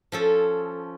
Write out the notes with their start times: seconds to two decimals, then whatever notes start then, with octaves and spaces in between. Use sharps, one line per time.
0.12 F3 C#4 A4